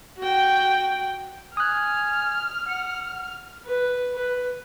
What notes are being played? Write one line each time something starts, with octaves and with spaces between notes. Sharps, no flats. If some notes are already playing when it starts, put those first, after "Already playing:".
F#4 G5
G#5 D#6 F6 F#6
F#5
B4
B4